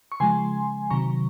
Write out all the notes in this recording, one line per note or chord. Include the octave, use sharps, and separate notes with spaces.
C#6
C#3 F3 G#3 G#5 C6
C3 D#3 F#3 A#5 C#6